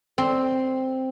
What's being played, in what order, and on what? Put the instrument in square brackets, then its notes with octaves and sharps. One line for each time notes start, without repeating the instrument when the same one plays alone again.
[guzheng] C4